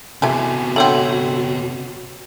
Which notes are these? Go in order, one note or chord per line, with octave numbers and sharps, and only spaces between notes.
C3 E3 A3 B3 F#4 G#4
D3 A3 C4 A4 C#5 F#5